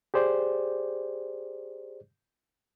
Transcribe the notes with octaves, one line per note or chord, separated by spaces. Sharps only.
G4 G#4 C5 D5